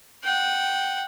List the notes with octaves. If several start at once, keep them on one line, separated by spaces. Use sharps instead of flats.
F#5 G5